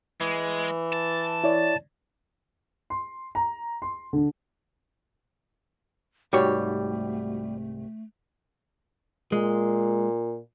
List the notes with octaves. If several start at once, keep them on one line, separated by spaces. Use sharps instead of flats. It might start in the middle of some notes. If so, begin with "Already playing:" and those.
E3 G#3
A5
E4 C#5 D5
C6
A#5
C6
D3
C2 G#2 G3 A3 D#4 F#4 G4 C#5
A#2 G#3